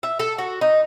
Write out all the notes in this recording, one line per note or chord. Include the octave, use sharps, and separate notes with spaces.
E5
A4
F#4
D#4